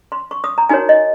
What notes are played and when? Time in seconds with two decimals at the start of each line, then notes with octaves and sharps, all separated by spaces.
0.12 C6
0.31 C#6
0.44 D#6
0.58 A#5
0.69 D#4 F#4 A#4 C#5 G#5
0.89 D#5